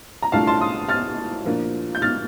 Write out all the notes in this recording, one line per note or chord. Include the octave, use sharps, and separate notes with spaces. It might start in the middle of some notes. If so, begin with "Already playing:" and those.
A#5
C2 A#2 A3 D4 F5 A5
A5 C6
C6 D#6
F6 A6
A#2 F3 A#3 D4 F4
G6
F6 A6